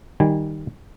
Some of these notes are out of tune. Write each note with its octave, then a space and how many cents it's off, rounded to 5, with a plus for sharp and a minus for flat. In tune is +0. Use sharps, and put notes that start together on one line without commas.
D#3 -5 G3 +0 G#5 -20